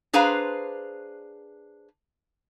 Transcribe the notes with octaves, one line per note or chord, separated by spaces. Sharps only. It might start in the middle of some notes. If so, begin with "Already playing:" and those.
D4 G#4 B4 C5 F5 A#5